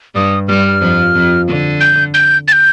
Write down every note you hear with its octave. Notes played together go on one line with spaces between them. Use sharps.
G2 G3 D#6
G2 G3 F6
F2 F3
F2 F3
D3
G6
G6
A6
G6